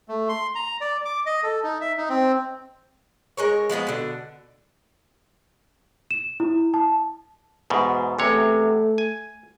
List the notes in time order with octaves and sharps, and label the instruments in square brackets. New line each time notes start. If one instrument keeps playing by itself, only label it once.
[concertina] A3
C6
A#5
D5
D6
D#5
A4
D#4
E5
D#4
C4
[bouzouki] G#3 A#4 C#5
F3 G#3 B3 D#4
B2 D3
[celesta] E7
E4
A5
[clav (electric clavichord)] E2 G#2 B2
[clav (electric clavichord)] E2 C3 C#5 [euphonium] A3
[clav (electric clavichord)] G#5